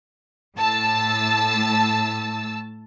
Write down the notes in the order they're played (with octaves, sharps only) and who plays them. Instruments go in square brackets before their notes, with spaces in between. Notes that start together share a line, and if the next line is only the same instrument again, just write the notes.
[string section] A2 A5 E6